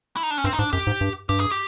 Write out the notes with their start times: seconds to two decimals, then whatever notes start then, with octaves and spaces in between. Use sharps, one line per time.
0.17 E4
0.23 D#4
0.31 D4
0.38 C#4
0.44 G2 C4
0.53 D#4
0.59 G#2 D4
0.73 F#2 G4
0.87 G#2
1.01 G2
1.29 G2 G4
1.40 G#4
1.51 G4